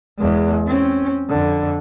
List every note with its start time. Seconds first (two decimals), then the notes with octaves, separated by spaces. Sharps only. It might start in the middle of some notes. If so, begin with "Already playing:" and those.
0.18 E2 G#3
0.68 C4 C#4
1.29 F2 D3